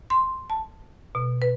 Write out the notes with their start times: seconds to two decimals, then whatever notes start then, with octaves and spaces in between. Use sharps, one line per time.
0.10 C6
0.50 A5
1.15 B2
1.42 B4